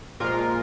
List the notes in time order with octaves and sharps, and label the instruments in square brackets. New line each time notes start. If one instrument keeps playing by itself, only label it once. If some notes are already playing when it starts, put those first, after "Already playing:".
[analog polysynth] A#2 F3 G#3 F4 A#4